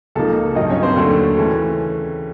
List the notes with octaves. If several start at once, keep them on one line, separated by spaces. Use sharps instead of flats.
C#2 C#3 F3 A#3 D#4 A4 A5
G2 D#3 F#3 D#4 D#5
C#4 C#5
C4 C5
D#2 D3 F#3 A3
C#3 E3 A3 C#4